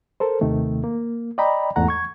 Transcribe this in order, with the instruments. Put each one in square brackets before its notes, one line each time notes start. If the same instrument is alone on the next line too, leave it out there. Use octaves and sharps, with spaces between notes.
[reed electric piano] A4 A#4 C5
D#2 C3 D#3 A3
A#3
D5 D#5 G5 A#5 B5
E2 G#2 A3 F#5 A#5
C#6 G#6